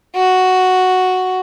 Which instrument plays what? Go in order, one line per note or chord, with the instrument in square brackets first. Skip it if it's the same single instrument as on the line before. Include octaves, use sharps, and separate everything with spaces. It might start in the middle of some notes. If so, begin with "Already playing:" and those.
[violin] F#4